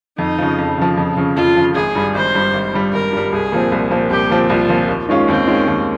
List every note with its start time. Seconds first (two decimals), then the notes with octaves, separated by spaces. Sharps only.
0.18 F2 D#4
0.38 C#3 F3
0.58 F2
0.77 C#3 F3
0.97 F2
1.17 C#3 F3
1.36 F2 F4
1.56 C#3 F3
1.75 G#1 G#4
1.95 G2 G3
2.15 G#1 C5
2.35 G2 G3
2.53 G#1
2.74 G2 G3
2.93 G#1 A#4
3.12 G2 G3
3.32 C2 G#4
3.52 A#2 F3 C4
3.72 C2
3.90 A#2 F3 C4
4.10 C2 G4
4.30 A#2 F3 C4
4.49 C2 F4
4.69 A#2 F3 C4
4.89 D#2
5.09 D#3 G#3 C#4 F4
5.28 D#2 C4
5.47 D#3 G#3 C#4 F4
5.67 D#2